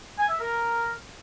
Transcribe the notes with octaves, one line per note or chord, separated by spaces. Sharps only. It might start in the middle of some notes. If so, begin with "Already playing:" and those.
G#5
E5
A#4